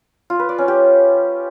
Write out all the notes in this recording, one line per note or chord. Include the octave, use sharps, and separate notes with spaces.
F4
B4
D5
C#4
G4